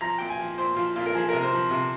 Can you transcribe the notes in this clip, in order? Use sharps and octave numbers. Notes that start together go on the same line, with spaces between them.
F3 A#5
A#2 G5
G#5
F3
A#2 C5
F3 F4
A#2 F4
A#4
F3 G#4
A#4
C3
C5
F3
C3